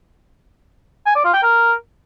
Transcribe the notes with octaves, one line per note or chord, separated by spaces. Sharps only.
G#5
D5
F4
G5
A#4